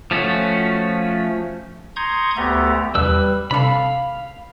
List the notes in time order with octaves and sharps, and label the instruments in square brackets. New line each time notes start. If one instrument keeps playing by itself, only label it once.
[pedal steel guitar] F3 A3 C#4 F#4
[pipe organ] A#5 C6 C#6 D#6 G6 G#6
D2 A3 B3 G4 A4 A#5
[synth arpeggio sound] E2 D4 [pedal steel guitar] G3 B4 E6
[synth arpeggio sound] C3 D4 A4 [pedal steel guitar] F5 B5